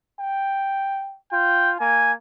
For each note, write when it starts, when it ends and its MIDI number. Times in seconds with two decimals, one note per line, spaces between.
0.20 1.17 79
1.33 1.79 65
1.33 1.72 79
1.80 2.14 58
1.80 2.13 80